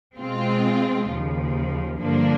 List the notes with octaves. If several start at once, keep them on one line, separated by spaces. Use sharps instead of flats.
B2 G#3 C4 F4
D#2 C#3 F3
G2 D3 F3 A#3 D4